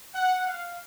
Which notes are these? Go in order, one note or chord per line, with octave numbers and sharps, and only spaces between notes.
F#5
F5